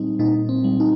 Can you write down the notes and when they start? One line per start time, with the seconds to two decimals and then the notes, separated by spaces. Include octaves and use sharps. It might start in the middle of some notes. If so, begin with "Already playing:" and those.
Already playing: A#2 G3 C4 D#4
0.19 A#2 D#4
0.49 C4
0.64 G3
0.80 D#4